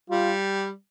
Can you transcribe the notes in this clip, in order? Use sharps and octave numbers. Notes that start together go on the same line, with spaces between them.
G3 F4